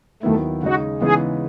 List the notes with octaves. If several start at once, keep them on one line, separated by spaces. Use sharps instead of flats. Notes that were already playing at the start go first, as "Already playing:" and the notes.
D#2 D#3 F#3 A3 B3 E4
C#3 G#3 D#4 F#4
C#3 E3 G#3 B3 D#4 G#4